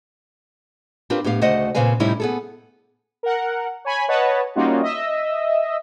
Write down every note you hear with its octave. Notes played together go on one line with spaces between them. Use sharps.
C4 D4 F4 G4 A#4 B4
A2 B3 G4 F5
D2 C#3 A3 C5 D#5 F#5
A#2 C#3 C4 B4 F5 G#5
A2 C3 G3 C#4 D#4 E4
B3 G#4 A4
A#4 F#5
C#5 G#5 B5
B4 C#5 D#5 F#5 A5
G3 A#3 C#4 D#4 F4 F#4
D#5 E5 E6